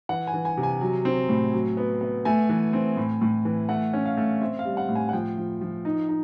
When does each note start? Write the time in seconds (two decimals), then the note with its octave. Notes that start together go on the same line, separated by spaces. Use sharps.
0.09 E3 F#5
0.27 G#5
0.33 E3
0.45 G#5
0.57 C3
0.63 G#5
0.81 F#3
1.05 C4
1.29 A2
1.53 F#3
1.77 B3
2.01 B3
2.25 A3 G#5
2.49 E3
2.73 C4
2.97 A2
3.21 A2
3.45 E3
3.69 A3 F#5
3.93 C#4
4.05 F5
4.17 A3
4.41 C4 E5
4.59 F5
4.65 G3
4.77 F#5
4.89 A2
4.95 G#5
5.09 F#5
5.13 F3 G5
5.38 F3
5.61 F3
5.85 D#4
6.09 D#4